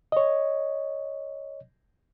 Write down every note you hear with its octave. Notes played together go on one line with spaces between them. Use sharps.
C#5 D#5